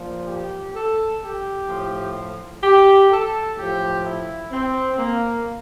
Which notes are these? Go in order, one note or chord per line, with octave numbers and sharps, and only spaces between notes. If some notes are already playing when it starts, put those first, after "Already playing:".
Already playing: A#2 F3
G4
A4
G4
A2 F3
G4
A4
A2 F3 G4
E4
C4
A#3